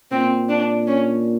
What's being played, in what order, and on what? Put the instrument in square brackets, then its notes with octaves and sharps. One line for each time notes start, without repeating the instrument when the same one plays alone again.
[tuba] A#2 [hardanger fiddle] C4
[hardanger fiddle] D4
C#4